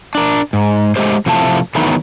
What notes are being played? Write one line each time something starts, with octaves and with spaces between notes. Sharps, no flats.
D4 A#4
G#2
G#3 A3 G4 C5
C3 F3 A3 E4 A5
D#3 E3 F#3 A3 B3 D#4